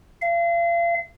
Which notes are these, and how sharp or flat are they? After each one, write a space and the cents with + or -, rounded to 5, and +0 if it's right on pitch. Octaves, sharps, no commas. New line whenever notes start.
F5 -35